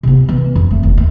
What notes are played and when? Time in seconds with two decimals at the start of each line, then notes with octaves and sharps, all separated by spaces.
0.03 C3 B3
0.29 E3 B3
0.55 F2
0.71 A3
0.83 F1 D#2
0.98 C4